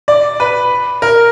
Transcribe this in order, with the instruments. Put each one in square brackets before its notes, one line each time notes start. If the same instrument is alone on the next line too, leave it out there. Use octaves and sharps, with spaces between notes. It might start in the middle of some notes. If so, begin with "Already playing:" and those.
[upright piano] D5
B4
A#4